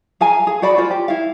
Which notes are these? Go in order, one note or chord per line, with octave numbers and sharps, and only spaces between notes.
G#4 F5 G#5 A#5
G#4
F#4 C5 D5 B5
F4 C5 D5 G#5
G4
E4 F5